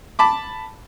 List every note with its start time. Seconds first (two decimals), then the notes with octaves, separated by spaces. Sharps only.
0.19 A5 B5 D6